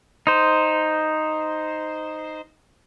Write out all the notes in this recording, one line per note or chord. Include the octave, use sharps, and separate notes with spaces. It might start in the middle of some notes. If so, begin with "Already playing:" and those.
D#4 C5